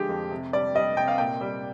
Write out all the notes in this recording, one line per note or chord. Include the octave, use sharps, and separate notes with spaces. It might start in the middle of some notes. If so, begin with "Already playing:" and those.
Already playing: D3 F3 G#3 G4
F2
C3
G3 D5
G3 D#5
C3 G5
F5
A#2 G5
G3